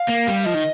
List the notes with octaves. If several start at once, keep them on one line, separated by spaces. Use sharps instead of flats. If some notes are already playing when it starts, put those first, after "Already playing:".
Already playing: F5
A#3
G3
F3 D#5
D#3